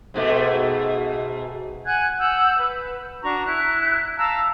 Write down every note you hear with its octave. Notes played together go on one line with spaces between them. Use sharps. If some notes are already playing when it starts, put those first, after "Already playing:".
G#2 B2 A3
F#5 G#5 F#6 G#6
F#5 E6 G6
B4
D4 F#4 A#5 C#6
E4 F#6
F5 A5 A#5 E6